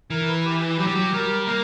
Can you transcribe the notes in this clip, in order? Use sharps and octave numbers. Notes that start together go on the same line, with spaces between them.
E3 A#4
B4
G4
B4
F#3 G4
G3
F#3
G3 A#4
A#3 A#4